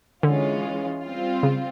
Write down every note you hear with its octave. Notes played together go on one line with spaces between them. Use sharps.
D3 E3 G#3 C#4 F4
G3 C4 F4
C#3